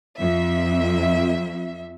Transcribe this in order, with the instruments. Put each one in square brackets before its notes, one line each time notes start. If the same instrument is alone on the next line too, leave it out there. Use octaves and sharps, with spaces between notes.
[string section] F2 E5